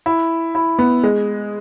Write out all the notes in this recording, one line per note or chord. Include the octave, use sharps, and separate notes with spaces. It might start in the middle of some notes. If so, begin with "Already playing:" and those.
E4
E4
B3
G#3